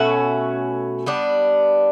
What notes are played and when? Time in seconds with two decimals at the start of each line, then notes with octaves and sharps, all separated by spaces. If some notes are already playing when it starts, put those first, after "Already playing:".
Already playing: B2 A3 C#4 F#4
1.06 G3 B3 D4